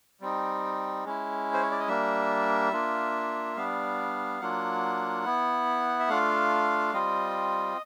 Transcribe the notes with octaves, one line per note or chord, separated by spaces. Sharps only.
G3 C4 D#4
G#3 C#4 E4
C5
C#5
D5
D#5
G3 A#3 D4 E5
A#3 D4 F4
G3 B3 D4 F5
F#3 A#3 D4 F4 F#5
B3 E4
E5
A3 D4 F4 F5
G3 C4 F4 D#5